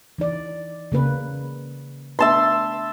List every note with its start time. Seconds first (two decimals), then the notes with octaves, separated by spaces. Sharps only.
0.18 E3 D#4 D5
0.92 C#3 A#3 B4
2.19 A3 B3 D4 E5 A5 C6